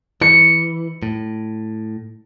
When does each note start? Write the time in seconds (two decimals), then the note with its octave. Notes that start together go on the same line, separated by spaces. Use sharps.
0.22 E3 C#7
1.03 A2